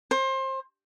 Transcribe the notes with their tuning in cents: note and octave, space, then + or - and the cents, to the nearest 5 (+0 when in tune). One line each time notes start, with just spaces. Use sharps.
C5 +25